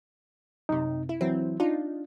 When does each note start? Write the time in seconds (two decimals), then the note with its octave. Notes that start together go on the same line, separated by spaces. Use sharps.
0.69 F#2 C3 D#4
1.09 E4
1.21 E3 F#3 C4 E4
1.60 D4 D#4 F4